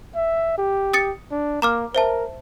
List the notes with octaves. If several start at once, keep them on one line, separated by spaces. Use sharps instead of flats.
E5
G4
D#6 A6 C#7
D4
A#3 A#5 D6 F6
A#4 C5 E5 A5